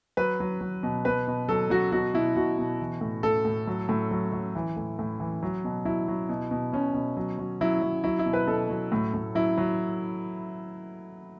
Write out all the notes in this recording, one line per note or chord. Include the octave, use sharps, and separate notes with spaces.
F#3 B4
F#3
F#3
B2
B2 B4
B2
F#3 A4
F#3 F#4
B2 F#4
B2 E4
B2 F#4
B2
E3
A2
A2 A4
A2
F#3
A2
F#3
F#3
E3
A2
A2
E3
F#3
B2
F#3 E4
F#3
B2
B2
B2 C#4
B2
F#3
F#3
F#3 E4
F#3
F#3 E4
E4
B2
B4
B2 A4
F#3
A2
A2
F#3 E4
F#3